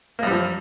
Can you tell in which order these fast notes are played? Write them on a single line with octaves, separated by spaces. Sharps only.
A#3 F#2 G3 F3